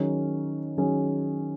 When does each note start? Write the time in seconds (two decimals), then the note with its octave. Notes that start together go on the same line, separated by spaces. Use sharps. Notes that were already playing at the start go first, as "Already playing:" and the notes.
Already playing: D#3 F#3 C#4 G#4
0.77 D#3 F#3 C#4 G#4